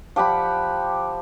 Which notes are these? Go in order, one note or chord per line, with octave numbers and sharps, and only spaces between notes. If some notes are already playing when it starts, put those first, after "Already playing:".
F3 G4 F#5 B5